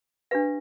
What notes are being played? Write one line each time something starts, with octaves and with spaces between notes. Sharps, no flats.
D4 G4 B4 F5